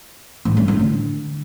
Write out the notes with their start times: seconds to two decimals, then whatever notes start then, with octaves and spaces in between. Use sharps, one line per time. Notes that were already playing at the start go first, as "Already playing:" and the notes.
0.45 A2
0.57 G2
0.68 A2
0.79 D3